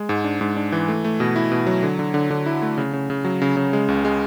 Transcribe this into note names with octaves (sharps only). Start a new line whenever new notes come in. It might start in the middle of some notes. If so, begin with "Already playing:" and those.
Already playing: G#3
G#2
D4
G#2
D4
E3
A3
A3
B2
E4
B2
F#3
D3
D3
D3
D3
E4
A3
C#3
C#3
C#3
F#3
C#3
C#3
G#3
C#2
G#3